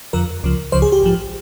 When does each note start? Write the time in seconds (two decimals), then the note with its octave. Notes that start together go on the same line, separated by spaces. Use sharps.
0.13 F2 D3 F3 A#4
0.43 C#2 C#3 F3
0.72 C#2 C#3 F3 C5
0.82 G#4
0.92 G4
1.02 A#1 G#2 F3